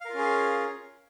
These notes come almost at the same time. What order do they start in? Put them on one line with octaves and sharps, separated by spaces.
F5 A#4 F4 C#4 G#4